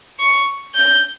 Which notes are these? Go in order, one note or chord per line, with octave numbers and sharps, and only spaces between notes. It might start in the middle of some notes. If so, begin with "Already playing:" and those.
C#6
G6